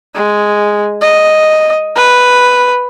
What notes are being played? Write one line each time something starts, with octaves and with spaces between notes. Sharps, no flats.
G#3
D#5
B4